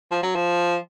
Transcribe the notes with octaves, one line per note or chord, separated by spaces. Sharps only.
F3
F#3
F3